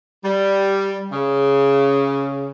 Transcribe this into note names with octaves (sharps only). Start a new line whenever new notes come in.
G3
C#3